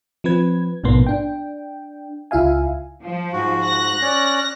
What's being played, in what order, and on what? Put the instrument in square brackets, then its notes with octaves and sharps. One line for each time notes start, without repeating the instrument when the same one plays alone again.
[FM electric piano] F3 C4 B4 G#6
A#1 G#2 B2 A#3 B3 C6
D4 G5
C#2 E4 F4 E5 F5 G#5
[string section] F3
[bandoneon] G#2 F#4
[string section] F#6 A#6
[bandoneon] C#4 C#5 D5